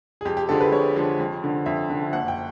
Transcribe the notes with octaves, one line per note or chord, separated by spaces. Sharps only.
G#4
F2 G4
G4
D3 F3 G#3 A4
B4
F2 C#5
D3 F3 G#3
F2
D3 F3
F2 E5
D3 F3
F#1 F#5
G5